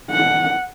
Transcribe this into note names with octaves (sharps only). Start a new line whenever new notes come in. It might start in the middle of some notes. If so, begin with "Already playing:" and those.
F#5